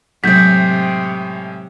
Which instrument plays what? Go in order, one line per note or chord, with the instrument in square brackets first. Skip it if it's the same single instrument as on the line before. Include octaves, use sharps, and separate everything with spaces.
[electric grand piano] A2 G#3 [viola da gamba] C3 [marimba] F#3 [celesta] G6 B6